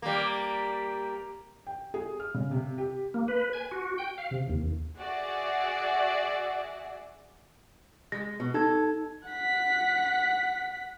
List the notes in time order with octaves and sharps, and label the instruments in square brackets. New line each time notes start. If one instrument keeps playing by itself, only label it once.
[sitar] G3 A#3
[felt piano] G5
G#4
F6
C#3
C3
G4
[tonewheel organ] A#3
B4
G#5
F#4
G5
F5
C3
D#2
[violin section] F#4 G#4 D5 E5 F#5
[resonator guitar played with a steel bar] G#3 [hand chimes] A#6
[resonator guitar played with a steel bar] B2
[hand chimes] D#4 G#6 [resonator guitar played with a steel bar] A4
[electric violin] F#5 B6